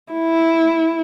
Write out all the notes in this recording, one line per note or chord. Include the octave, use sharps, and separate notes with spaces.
E4